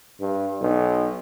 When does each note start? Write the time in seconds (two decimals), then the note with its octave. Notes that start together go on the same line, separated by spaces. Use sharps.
0.21 G2
0.62 B1